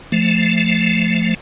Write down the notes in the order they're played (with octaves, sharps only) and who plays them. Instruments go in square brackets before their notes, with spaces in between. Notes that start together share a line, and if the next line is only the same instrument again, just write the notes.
[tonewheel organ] F3 A3